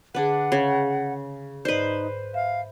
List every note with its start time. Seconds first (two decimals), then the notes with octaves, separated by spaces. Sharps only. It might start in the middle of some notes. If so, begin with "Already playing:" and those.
0.15 D3 D4 G#4 B4 F#5
0.52 C#3
1.65 G#2 D#4 B4 C5 D5
2.34 E5 F5